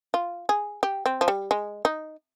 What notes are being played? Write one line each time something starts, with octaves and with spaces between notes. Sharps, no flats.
F4
G#4
G4
C4
F3
G3
G#3
D#4